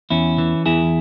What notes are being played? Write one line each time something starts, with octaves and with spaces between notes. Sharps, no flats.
E2 C#4 E4
E3
E2 E4 G#4